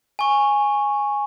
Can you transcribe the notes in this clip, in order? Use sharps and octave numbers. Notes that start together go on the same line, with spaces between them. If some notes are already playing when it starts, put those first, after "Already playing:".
G#5 C#6